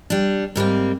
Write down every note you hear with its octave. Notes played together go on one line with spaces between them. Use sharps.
G3 D4
G#2 G3 A#3 C4